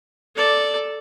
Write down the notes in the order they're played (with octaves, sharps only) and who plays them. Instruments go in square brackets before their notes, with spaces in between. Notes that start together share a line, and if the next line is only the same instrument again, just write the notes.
[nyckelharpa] A4 D5